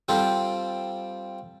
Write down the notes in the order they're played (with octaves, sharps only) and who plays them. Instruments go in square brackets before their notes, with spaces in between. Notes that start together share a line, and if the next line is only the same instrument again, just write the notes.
[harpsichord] G3 C4 F4 A4 C5